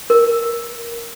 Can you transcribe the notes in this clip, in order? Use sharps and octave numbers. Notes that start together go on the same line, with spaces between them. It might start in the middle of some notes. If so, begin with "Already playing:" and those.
A#4